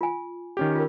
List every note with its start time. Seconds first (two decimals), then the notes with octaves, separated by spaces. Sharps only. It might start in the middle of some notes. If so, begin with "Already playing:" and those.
0.01 F4 G#5
0.57 D#3 C#4 G4
0.75 F4 A#4